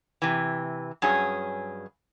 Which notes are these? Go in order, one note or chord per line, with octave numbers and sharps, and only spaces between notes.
C3 E3
G2 F#3 C#4 G#4